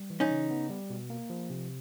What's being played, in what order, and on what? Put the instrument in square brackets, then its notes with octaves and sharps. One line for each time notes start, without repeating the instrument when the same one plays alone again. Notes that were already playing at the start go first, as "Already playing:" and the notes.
Already playing: [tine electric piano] G3
E3
[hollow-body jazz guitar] C#4 D#4
[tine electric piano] C#3
B3
G3
B2
A#3
F3
C3